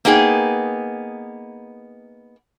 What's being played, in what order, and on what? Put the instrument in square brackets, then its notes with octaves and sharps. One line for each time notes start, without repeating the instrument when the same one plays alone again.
[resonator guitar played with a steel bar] A#3 B3 D#4 G#4 G5